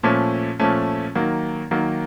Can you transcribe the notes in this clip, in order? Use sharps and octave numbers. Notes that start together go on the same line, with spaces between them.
A#2 F3 A3 C#4
A#2 F3 A3 C#4
D#3 F#3 A#3
D#3 F#3 A#3